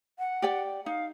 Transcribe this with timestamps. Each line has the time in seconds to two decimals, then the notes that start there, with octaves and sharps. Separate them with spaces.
0.19 F#5
0.42 G4 D5 G5
0.86 D#4 F5